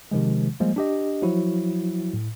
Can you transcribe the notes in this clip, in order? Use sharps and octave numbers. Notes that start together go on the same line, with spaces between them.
C3 D#3 F3 G#3
F3 G3 G#3 A#3
D4 G4 D#5
F3 F#3 E4 F#4
A2